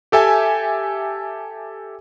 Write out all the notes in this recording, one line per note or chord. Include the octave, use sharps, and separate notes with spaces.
G4 A4 E5 G#5